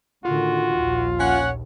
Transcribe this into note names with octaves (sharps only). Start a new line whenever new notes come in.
A2 D3 D#3 F4 F#4
A#1 D#2
C#4 C#5 F#5